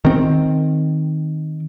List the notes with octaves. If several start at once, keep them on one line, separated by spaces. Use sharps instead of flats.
D#3 C4